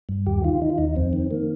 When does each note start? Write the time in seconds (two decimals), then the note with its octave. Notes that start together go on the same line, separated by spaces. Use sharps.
0.09 G2
0.26 D#2 G4
0.44 D#3 F4
0.62 D#3 D#4
0.70 F4
0.78 D#2 D#4
0.96 F2 C4
1.13 D#3
1.31 D#3 A#3